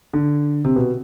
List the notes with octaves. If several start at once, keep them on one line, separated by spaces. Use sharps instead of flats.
D3
C3
B2